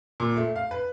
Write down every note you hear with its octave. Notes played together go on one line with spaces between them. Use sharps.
A#2
A3
F5
B4